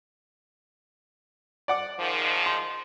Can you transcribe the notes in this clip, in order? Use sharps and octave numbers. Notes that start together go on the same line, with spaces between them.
D5 F#5 D6
G#2 D#3 F3
C6